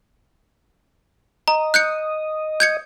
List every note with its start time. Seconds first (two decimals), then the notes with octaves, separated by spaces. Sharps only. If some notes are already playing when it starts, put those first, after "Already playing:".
1.48 D#5 A#5
1.74 F#6 G6 C#7
2.60 G6 G#6 C#7